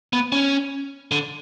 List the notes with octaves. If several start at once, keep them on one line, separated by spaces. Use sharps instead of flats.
B3
C#4
D3